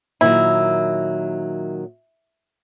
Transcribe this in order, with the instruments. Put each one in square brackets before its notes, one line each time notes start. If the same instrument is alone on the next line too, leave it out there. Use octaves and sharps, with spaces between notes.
[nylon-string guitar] A#2 D#3 F#3 [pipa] E4